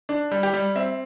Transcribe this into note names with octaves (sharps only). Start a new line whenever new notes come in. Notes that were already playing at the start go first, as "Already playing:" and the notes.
D4
G3
G4
G3
C4 E5